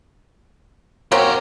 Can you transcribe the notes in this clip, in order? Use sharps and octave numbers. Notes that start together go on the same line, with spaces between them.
F#3 A#3 C4 C#4 G4 A#4 C#5